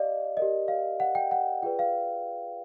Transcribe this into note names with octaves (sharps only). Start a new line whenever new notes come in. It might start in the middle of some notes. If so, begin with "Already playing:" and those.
Already playing: G4 D5 D#5 F5
G4 A#4 D5 D#5
F5
F#5
G5
F#5
F4 G#4 B4 D5 G5
F5